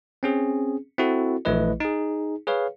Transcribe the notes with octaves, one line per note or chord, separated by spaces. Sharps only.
C4 C#4 G#4
C4 E4 F#4 A4
A#1 E3 A3 E4 B4 D#5
D#4 G#4
G#4 B4 C#5 F5